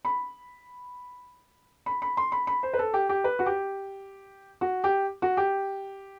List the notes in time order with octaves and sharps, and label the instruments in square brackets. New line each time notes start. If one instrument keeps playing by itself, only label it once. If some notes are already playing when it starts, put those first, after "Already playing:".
[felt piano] B5
B5
B5
C6
B5
B5
C5
B4
A4
G4
G4
B4
F#4
G4
F#4
G4
F#4
G4